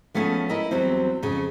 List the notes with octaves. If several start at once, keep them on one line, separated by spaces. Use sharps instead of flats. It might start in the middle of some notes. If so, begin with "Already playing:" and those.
F3 A3 B3 C#4 F4 G#4
E4 A#4 D#5 E5
E2 F#3 G3 C4
F2 C#3